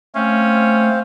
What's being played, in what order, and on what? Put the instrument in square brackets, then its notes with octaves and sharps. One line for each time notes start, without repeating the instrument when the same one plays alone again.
[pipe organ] A3 [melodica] C4 C5 F5 [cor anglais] C#4